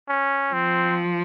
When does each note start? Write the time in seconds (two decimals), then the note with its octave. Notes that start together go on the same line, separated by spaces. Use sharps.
0.09 C#4
0.53 F3 C4